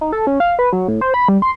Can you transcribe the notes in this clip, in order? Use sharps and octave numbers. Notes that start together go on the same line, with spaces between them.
D#4
A4
C#4
F5
B4
F#3
A2
C5
B5
G3
C6